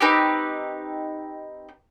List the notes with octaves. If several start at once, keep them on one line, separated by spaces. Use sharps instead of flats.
C4 D#4 G4 B4